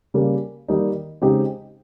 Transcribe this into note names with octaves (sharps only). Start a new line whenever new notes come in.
C#3 G3 A#3
D#3 G3 A#3 D#4
C#3 G#3 C4 D#4 G4